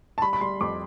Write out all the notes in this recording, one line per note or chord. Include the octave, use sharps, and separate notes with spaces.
A5
G3 B5
B5
G3 C6
F2 D6